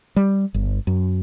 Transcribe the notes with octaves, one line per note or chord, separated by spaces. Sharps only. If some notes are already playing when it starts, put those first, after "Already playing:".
G3
G1
F#2